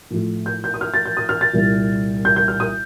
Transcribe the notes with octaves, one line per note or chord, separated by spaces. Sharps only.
A2 F3 A3
G6
G6
D#6
F6
A6
G6
D#6
F6
A6
C2 A#2 G3
G6
G6
F6
D#6